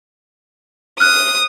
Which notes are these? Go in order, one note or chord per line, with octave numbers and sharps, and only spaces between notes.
D#6 F6 F#6